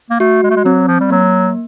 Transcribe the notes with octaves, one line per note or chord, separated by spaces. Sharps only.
A#3
A3 F#4
G#3
A3
G#3
F#3 C4
F3
G3
F#3 A#3